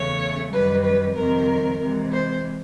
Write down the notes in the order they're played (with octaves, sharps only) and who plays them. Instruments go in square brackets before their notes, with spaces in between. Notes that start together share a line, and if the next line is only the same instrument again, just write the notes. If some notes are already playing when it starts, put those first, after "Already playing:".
Already playing: [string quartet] E2 C#3 E3 A3 C#5
F#2 D#3 G3 B4
B4
F2 C3 D#3 G3 A#4
C3 E3 G#3
C5